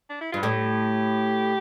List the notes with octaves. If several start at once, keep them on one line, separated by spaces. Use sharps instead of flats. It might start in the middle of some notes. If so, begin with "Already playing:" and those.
D4
E4
G2 F4
A2 G4